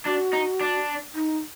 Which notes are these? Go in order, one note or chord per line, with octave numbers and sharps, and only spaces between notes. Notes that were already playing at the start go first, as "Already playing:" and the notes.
D4 F#4
D#4
D4
D#4